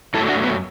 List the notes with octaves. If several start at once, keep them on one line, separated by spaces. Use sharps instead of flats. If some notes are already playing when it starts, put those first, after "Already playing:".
F#2 F#3 A3 E4 A4
D4 F#4
B3